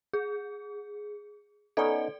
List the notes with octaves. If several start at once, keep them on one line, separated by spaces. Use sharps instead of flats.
G#4
B3 C#4 D#4 A4 D5